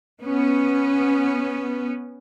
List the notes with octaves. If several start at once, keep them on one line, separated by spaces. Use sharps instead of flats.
B3 C#4